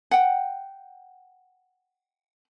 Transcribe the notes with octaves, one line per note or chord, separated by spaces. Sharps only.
F#5 G5